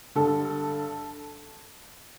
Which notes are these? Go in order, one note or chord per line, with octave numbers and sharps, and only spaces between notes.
G2 D3 A4